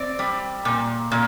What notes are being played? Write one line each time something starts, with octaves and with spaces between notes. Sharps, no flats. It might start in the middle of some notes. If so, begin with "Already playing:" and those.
Already playing: C4 D5
G3
A#2
A#2